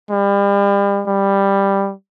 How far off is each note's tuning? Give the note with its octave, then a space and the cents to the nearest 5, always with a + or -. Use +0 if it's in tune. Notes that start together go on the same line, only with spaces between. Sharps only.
G3 +35
G3 +10